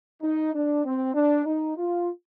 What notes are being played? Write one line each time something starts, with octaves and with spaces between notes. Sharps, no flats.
D#4
D4
C4
D4
D#4
F4